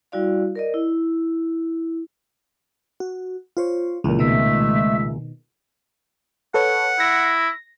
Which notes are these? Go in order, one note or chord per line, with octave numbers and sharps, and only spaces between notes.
G3 E4 F#4 D5 F5
A#4 D5 D#5
E4
F#4
F4 C5 C#5
C#2 A#2 E3
B2 D#3 G#3 A3 E5
A4 B4 C#5 F#5
E4 A#6